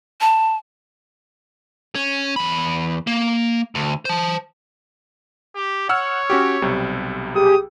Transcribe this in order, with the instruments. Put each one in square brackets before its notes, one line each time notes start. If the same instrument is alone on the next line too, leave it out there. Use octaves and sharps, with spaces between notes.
[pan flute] A5
[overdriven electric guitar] C#4
E2 B5
A#3
D2
C5 A5
[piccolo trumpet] G4
[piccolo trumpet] C#5 [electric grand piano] F#5 E6 F6
[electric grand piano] C#4 F#4 G4
B1 C3 G3
[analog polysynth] G4 G#4 [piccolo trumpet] D#6